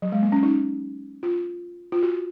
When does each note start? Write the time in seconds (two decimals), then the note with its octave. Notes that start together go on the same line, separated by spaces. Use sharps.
0.02 F#3
0.12 G#3
0.22 A#3
0.32 C#4
0.43 D#4
1.23 F4
1.92 F4
2.03 F#4